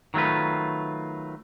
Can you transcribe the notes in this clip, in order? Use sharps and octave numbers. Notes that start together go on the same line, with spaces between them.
D#3 F#3 A3 F4 B4